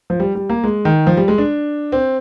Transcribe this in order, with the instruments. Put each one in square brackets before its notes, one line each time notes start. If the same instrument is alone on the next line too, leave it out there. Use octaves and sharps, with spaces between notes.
[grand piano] F3
G3
G3
A#3
G#3
D#3
F3
G3
G#3
D4
C4